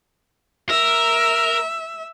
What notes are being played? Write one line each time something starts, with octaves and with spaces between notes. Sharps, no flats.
A#4 E5